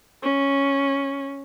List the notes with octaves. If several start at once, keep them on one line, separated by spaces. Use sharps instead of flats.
C#4